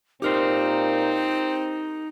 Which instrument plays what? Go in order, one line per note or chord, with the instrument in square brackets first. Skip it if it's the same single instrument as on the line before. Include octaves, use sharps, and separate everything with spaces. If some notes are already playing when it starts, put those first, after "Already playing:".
[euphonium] A#2 [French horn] C4 [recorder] D#4 [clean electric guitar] G4 A#4 C5